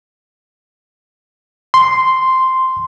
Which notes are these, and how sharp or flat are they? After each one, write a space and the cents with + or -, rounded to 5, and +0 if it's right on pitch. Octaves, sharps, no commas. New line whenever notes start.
C6 -5